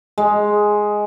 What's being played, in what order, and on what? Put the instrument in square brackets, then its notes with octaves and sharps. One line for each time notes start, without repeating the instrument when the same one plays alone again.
[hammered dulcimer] G#3